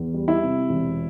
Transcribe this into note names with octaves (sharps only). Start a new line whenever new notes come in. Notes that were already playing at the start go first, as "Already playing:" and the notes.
Already playing: E2
G3
E4
C3
E1